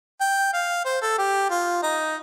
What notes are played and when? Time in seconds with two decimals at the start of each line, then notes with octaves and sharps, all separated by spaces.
0.21 G5
0.53 F5
0.85 C5
1.02 A4
1.18 G4
1.50 F4
1.83 D#4